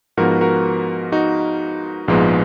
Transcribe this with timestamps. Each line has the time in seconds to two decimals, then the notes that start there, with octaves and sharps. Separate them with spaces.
0.17 G#2 F3 B3 F#4 A#4
0.41 F#4 A#4
1.12 D#4 F#4
2.08 A#1 G#2 F3 G#3 B3